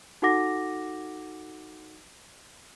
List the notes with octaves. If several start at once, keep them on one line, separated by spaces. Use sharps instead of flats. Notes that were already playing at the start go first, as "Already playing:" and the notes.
D#4 F#4 A4 F#5 D6 A#6